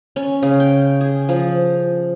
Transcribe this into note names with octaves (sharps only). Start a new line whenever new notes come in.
C#4
C#3
G5
G#4
F3